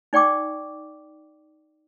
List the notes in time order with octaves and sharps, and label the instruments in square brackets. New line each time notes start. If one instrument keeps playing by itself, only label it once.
[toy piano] D#4 D5 G5 C#6 D6